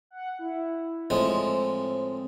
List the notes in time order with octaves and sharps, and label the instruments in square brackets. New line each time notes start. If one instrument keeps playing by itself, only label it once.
[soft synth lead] F#5
E4
[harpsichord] A2 F3 G#3 [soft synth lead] C4